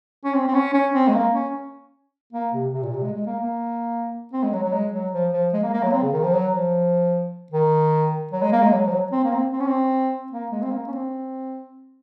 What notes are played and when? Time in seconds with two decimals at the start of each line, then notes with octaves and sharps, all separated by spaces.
0.24 C#4
0.34 C4
0.48 C4
0.54 C#4
0.74 C#4
0.94 C4
1.08 G#3
1.14 A#3
1.34 C#4
2.33 A#3
2.53 C3
2.73 C3
2.83 A#2
2.93 C3
3.03 G#3
3.14 G#3
3.26 A#3
3.40 A#3
4.33 C4
4.43 G#3
4.53 F#3
4.63 F#3
4.73 G#3
4.93 F#3
5.13 F3
5.33 F3
5.53 G#3
5.63 A#3
5.73 A#3
5.83 F#3
5.93 C4
6.03 C#3
6.13 D#3
6.23 F3
6.33 F#3
6.53 F3
7.52 D#3
8.32 F#3
8.42 G#3
8.52 A#3
8.63 G#3
8.73 F#3
8.87 F3
8.92 F#3
9.12 C4
9.24 A#3
9.32 C4
9.53 C4
9.60 C#4
9.67 C4
10.32 A#3
10.52 G#3
10.62 C4
10.71 A#3
10.87 C#4
10.92 C4